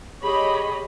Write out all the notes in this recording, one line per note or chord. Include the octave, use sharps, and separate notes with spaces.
G4 G#4 C#5 D#5 B5